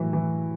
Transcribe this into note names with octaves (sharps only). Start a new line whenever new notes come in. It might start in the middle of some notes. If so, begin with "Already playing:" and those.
Already playing: A2 E3 F#3
E3